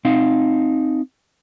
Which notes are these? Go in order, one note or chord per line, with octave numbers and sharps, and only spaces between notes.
C4 D#4 F5